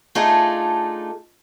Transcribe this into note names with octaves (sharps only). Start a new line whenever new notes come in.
A3 D4 D#4 F4 G#4 A4